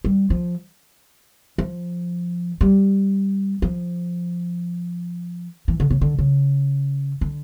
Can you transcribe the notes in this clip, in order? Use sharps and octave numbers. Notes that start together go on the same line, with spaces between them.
G3
F3
F3
G3
F3
E3
D3
C#3
D3
C#3
D3